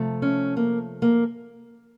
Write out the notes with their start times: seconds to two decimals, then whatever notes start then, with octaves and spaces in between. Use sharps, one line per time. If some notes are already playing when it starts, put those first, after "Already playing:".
Already playing: C3 F3 A3
0.22 C#4
0.57 A#3
1.02 A#3